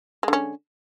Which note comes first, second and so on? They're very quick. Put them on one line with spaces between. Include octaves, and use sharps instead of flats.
G#3 D3 C#4